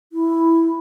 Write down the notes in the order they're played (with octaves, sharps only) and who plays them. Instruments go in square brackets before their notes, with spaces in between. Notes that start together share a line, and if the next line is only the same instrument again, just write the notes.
[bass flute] E4